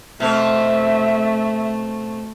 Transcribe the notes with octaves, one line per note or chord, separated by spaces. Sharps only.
B2 A3 C4 E5